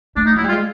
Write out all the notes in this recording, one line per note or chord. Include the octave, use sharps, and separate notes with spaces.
A3 D4
D#4
F#3 E4
G3
F4
G#3